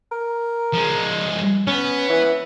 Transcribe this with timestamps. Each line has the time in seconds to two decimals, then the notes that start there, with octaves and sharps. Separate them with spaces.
0.12 A#4
0.74 F3 G#3
1.67 B3 C#4
2.10 E3